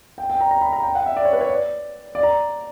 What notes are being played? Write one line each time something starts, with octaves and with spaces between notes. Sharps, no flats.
G5
G5
A#5
A#5
B5
A#5
G5
F#5
E5
D5
C#5
B4
C#5
D5
D5
A#5